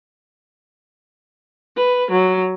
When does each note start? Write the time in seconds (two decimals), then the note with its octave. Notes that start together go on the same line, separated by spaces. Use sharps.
1.76 B4
2.11 F#3